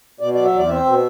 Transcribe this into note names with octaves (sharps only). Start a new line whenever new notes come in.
B2 D5
F#3 D5
E5
E2 D5
C4 E5
B2